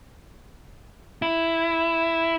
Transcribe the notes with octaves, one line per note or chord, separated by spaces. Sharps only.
E4